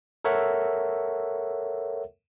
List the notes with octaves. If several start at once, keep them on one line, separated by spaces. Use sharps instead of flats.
A4 A#4 C#5 E5 F#5